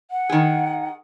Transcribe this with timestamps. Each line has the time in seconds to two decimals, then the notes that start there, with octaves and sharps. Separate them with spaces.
0.11 F#5
0.29 D#3 G#4